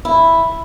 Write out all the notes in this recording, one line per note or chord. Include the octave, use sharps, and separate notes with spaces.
E4